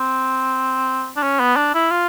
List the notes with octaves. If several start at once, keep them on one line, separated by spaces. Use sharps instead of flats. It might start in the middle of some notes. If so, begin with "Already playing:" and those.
Already playing: C4
D4
C#4
B3
D4
E4
F4